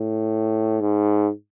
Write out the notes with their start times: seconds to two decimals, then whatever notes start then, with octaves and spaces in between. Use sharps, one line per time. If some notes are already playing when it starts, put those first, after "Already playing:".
Already playing: A2
0.80 G#2